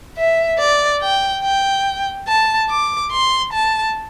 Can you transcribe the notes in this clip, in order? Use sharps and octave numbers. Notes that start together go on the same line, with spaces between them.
E5
D5
G5
G5
A5
D6
C6
A5